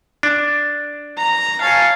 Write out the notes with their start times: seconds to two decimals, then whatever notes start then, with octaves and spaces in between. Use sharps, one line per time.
0.23 D4
1.17 A#5
1.61 C#5 F5 G#5 A5